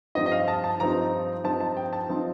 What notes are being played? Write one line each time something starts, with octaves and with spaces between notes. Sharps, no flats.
G2 F3 C4 D#4 D#5
D#5
F5
A5
A5
G2 F3 C4 D#4 A#5
G2 F3 C4 D#4 A5
A5
G5
A5
F3 C4 D#4